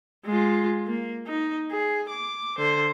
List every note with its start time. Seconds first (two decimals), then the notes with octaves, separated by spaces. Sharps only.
0.26 G#3 F4
0.87 A#3
1.27 D#4
1.71 G#4
2.10 D6
2.59 D3 C5